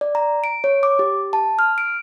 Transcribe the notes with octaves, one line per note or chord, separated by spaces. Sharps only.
D5
A#5
D7
C#5
D6
G4
A5
F6
D7